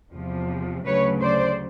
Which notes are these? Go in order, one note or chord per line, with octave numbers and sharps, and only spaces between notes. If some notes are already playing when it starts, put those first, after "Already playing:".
E2 C3 F3
D2 C#3 F#3 B4 C#5
C5 D5